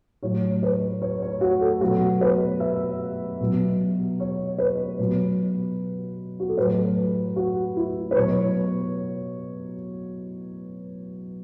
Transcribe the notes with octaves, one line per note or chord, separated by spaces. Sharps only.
A2 F#3 C#5
B4
C#5
C#5
F#4
A4
B2 F#3 F#4
B4
E5
B2 F#3
C#5
B4
B2 F#3
F#4
A4
A2 F#3 B4
F#4
E4
B4
B2 F#3 C#5